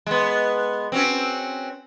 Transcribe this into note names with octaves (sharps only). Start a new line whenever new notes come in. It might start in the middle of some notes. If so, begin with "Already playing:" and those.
G#3 B3
C4 C#4 F#4